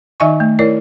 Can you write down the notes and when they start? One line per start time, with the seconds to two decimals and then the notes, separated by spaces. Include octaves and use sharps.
0.20 D#3 D#4 D#5 E5 G#5 C#6
0.40 A3
0.59 E4 A#4 C#5 D5